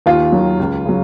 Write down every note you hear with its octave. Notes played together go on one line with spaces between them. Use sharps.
D#2 F4
D#3 F#3
C#2
C#3 F#3